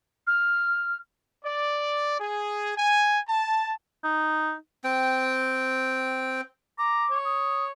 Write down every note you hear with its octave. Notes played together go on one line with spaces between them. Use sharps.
F6
D5
G#4
G#5
A5
D#4
C4 G5
A#5 D6
C#5
D#6